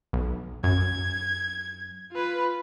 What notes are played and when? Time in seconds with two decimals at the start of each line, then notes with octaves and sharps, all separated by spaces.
0.13 B1
0.64 F#2 G#6
2.12 F4 B4